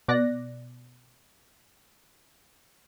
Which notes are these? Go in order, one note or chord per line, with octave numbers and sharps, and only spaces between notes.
B2 D5 F#6 A#6